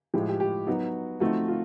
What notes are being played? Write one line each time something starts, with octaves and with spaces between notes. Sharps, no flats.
A2 F3 G#3 G4
G#4
G4
G4
F#3 B3 D#4 F#4
F3 A3 C4 D#4 F#4
F4